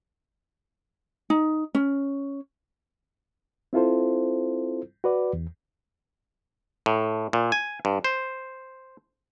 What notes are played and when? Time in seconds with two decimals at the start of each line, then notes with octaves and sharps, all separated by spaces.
1.30 D#4
1.75 C#4
3.73 C4 E4 F4 A4 C5
5.04 F#4 B4 D5
5.33 E2
6.86 A2
7.33 A#2
7.52 G#5
7.85 G2
8.04 C5